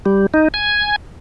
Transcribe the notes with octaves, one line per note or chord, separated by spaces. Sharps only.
G3
D#4
G#5